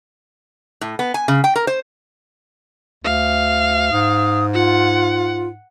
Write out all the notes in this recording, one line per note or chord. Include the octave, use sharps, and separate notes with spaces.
A2
B3
G#5
C#3
G5
A#4
C5
D2 F5
G#2 D#6
F4 F#5